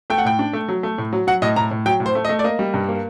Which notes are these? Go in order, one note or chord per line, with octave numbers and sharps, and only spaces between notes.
A3 G5
F#5
A2 G5
D4
A3
F#3
A3
A2
F#3
F#3 F#5
A2 D#5
A2 A#5
A2
F#3 G5
A2
C5
A3
D#5
A3
D5
A#3 D#5
G3
G2
A#3